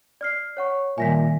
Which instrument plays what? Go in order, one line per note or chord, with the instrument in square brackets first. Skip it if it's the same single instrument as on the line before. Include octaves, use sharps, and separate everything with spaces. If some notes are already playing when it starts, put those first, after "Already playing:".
[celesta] D5 F6 C7
C#5 F#5 C#6
[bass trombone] A#2 [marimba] D#3 G3 E5 [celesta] G#5 A#6 B6